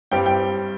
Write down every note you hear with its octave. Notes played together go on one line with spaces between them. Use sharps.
G2 G3 C4 G5
G5